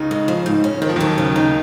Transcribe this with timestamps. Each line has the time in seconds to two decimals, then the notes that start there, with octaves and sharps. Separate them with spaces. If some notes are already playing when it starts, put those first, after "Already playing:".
Already playing: C#2 C#3 D#4
0.11 G#3
0.28 F3
0.46 G#2
0.64 C#4
0.82 D#3 C4
0.89 F3
0.96 D#2 D#3 F#3
1.18 C#3
1.36 D#4